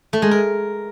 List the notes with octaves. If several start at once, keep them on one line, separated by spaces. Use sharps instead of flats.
A3
G#3
A#4